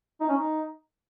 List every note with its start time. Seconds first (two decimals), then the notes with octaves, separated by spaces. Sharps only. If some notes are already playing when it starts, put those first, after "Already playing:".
0.21 D#4
0.29 C#4
0.37 D#4